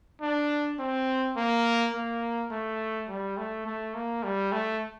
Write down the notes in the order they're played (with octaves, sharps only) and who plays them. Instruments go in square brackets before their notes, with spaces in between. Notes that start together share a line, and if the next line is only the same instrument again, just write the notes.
[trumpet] D4
C4
A#3
A#3
A3
G3
A3
A3
A#3
G3
A3